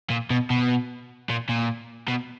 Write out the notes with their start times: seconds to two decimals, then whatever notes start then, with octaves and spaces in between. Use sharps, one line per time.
0.10 A#2
0.30 B2
0.50 B2
1.30 A#2
1.49 A#2
2.08 B2